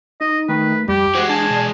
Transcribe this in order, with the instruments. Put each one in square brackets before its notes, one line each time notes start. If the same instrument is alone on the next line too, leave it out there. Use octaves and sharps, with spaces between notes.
[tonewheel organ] D#4 [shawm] D#5
[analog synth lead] D#3 [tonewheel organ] A3 [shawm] B4
[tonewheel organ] F2 [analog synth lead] G3 [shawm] G4
[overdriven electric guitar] E3 G#3 [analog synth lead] F#4 [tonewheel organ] C5 D6
[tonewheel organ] D4 [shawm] G#5 [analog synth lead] A5
[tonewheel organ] B2 D5